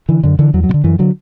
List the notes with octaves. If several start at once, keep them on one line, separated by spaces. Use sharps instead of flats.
D3 E3
F#2 D3
D3 E3
E2 F#3
F#3
B2
D3
F#2 E3
D3 F#3